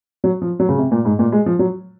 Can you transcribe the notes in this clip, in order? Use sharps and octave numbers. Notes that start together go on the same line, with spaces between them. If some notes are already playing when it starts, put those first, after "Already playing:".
F#3
F3
F#3
C#3
C3
A#2
G#2
A#2
G#3
F3
F#3